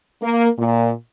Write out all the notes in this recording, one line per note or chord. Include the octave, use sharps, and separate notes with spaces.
A#3
A#2